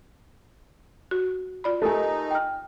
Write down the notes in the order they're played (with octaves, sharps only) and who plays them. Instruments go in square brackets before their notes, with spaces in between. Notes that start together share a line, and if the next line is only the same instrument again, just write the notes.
[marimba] F#4
F4 D5 B5
[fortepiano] A3 [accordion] D#4 [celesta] G4 A#4 G#5
[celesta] G5 F6